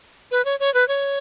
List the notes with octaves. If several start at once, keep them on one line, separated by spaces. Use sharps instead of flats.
B4
C#5
C#5
B4
C#5